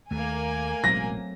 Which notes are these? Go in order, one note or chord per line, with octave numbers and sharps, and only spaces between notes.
D#2 A3 A#3 A#4 G#5
A1 B2 F#3 G#3 C4 A#6